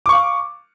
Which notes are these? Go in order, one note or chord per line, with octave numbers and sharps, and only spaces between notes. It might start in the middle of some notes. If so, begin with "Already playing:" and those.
F5 C#6 D6